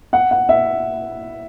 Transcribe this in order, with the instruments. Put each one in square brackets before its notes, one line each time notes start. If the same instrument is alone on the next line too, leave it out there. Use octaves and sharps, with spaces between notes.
[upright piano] F#5
F#5
E5